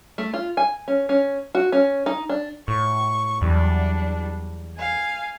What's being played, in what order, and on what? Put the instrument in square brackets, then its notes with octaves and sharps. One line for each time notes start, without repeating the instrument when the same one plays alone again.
[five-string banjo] A3
F4
G#5
C#4
C#4
F#4
C#4
D#4
D4
[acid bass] A2 [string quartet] C#6
[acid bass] E2 [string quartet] F#3 G3 D4
[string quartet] F5 G#5